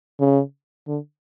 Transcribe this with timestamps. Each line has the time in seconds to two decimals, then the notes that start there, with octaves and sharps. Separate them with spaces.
0.20 C#3
0.88 D3